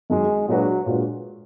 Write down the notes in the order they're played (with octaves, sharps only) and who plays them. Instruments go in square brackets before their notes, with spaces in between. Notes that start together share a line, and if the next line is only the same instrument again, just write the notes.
[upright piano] F#2 D#3 F#3 [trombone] G#3
[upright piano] A#2 G#3 D4 F#4 B4 [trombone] F#3
[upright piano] A#2 G#3 D4 F#4 B4